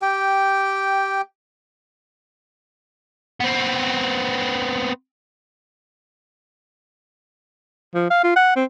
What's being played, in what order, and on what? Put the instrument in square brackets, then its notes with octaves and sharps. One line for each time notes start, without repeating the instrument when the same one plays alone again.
[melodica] G4 G5
[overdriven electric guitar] B3 C4
[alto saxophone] F3
F5
F4
F#5
C4